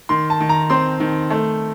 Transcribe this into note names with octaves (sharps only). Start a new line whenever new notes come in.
D#3 C6
A5
D#3
A#5
C4 C6
D#3
A3